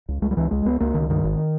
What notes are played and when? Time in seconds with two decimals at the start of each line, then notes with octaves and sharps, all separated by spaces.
0.09 C#2
0.22 C#2 G#3
0.31 G3
0.37 C#2 E3
0.51 C#2 G#3
0.65 C#2 B3
0.80 C#2 A#3
0.94 C#2 D#3
1.09 G2 D#3
1.24 G#1